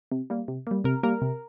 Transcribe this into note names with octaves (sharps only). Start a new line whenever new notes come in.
C3
G3 A#3
C3
G3 A#3
C3 A#4
G3 A#3 A#4
C3